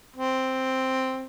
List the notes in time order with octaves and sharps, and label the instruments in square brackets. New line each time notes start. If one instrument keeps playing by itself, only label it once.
[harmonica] C4